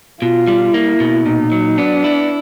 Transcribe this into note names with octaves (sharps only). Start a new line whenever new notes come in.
B2 F4
G3
A#3 E4
B2
A#2 D#4
F#3
B3 D4
E4